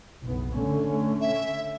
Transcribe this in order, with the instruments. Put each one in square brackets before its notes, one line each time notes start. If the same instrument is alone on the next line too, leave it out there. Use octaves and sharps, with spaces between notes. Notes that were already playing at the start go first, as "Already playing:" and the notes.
[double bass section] F#1 B1 B3
D3 A3 C#4
[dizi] E5